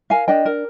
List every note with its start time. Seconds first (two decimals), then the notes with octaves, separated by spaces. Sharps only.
0.10 A#4 F5 G#5
0.28 D4 D#5 G5
0.45 A#4